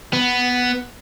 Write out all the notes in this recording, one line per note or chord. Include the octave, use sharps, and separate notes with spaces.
B3